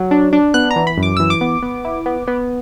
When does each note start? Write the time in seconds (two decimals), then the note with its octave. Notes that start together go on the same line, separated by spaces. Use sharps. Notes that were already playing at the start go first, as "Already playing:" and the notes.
Already playing: F#3
0.11 D4
0.33 D4
0.54 B3 F#6
0.71 A#5
0.76 E3
0.87 B5
0.98 F#2
1.03 D6
1.17 E3 E6
1.30 D6
1.41 B3
1.62 B3
1.85 E4
2.06 B3
2.28 B3